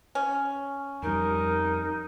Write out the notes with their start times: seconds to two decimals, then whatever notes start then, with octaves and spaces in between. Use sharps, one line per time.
0.15 C#4
1.03 F2 G3 D#4 A#4